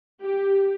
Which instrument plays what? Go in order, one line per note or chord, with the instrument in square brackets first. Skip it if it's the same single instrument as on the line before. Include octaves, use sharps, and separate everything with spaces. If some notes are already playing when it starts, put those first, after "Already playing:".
[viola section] G4